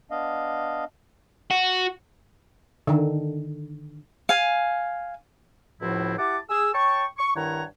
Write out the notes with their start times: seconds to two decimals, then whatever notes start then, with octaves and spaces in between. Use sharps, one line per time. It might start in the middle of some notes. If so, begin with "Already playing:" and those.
0.11 B3 D4 D#5 F5
1.51 F#4
2.87 D3 D#3
4.29 F5 G#5
5.81 C#2 A2 F3 C4 E4 F#4
6.17 E4 G4 F#5 A5 D6
6.50 G#4 E6
6.74 C#5 G5 A5 C#6
7.18 C#6
7.36 G2 D#3 E4 C#5 F#5 A#5